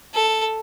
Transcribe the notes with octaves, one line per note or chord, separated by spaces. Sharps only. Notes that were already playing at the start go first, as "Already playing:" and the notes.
A4